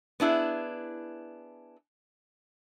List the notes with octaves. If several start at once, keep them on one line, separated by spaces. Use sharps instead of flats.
B3 D4 E4 G#4